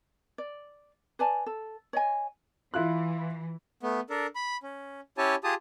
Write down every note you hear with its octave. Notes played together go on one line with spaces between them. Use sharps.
D5
B4 D5 G#5 A5
A4
C#5 D#5 G#5
E3 E4 F4 F#6
A3 B3
D4 A4 A#4
B5
C#4
C#4 E4 G4 C#5 G#5 A5
F4 G4 G#4 A5 D#6